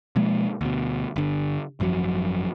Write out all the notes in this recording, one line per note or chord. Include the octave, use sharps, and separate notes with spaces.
B2 F3 G#3 A#3
D2 B2
G1 D3
G#1 F#2 F3 F#3